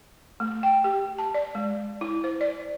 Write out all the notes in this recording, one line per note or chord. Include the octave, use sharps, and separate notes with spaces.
A3
G5
G4
A5
D5
G#3
E4
C5
D5